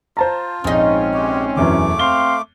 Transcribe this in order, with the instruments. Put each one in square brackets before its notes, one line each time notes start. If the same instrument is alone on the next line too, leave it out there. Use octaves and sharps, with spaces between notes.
[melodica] F4 [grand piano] C5 A5 A#5
[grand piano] A#1 [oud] G#2 D#4 [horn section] C4 C#4
[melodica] G#3 F#4 G4
[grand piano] E1 F#2 E3 [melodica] A3 D6
[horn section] C4 F5 C6 [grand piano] G7